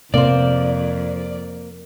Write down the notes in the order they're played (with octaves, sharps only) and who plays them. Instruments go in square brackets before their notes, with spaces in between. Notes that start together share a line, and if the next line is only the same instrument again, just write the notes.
[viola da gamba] F2 [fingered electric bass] C3 [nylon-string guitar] A#3 C5 [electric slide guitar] D5